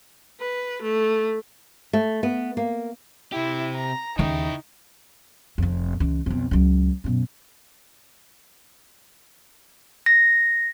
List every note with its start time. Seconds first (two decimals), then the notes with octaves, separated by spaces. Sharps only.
0.40 B4
0.82 A3
1.93 A3
2.23 B3
2.57 A#3
3.33 C3 E4 G4
3.75 A#5
4.19 D#2 C#3 D#4 E4 G5
5.58 F1 F2
6.00 C#2 E3
6.26 B1 F2
6.51 C#2 F#3
7.04 F#2 B2
10.06 A#6